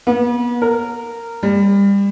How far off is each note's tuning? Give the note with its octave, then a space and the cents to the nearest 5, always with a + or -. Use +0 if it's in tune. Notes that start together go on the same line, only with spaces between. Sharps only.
B3 -40
A#4 -15
G3 +30